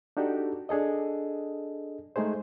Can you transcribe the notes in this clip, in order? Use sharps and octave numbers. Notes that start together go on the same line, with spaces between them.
D4 D#4 F#4 G4 A4
D4 G#4 A4 D#5
G#3 A3 D#4 G#4 C5